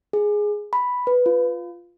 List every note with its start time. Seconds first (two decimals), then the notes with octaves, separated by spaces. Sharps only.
0.13 G#4
0.73 B5
1.07 B4
1.26 F4